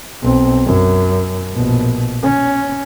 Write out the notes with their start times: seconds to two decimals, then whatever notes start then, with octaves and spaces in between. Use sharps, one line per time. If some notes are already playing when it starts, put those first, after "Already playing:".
0.23 B1 C4
0.66 F#2
1.54 A#1 B2
2.23 C#4